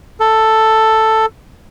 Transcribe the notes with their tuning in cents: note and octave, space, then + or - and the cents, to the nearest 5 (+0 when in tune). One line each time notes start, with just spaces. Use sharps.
A4 +5